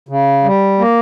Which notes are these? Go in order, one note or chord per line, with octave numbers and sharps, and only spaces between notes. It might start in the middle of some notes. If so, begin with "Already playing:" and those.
C#3
G3
A#3